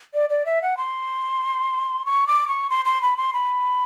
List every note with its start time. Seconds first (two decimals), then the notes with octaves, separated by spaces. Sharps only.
0.14 D5
0.30 D5
0.46 E5
0.62 F#5
0.77 C6
2.06 C#6
2.27 D6
2.48 C#6
2.70 C6
2.85 C6
3.02 B5
3.17 C6
3.33 B5